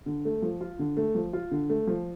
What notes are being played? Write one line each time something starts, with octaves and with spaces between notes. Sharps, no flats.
D3
A3
F3
F4
D3
A3
F3
F4
D3
A3
F3